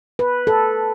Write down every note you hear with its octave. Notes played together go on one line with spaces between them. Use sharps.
B4
A4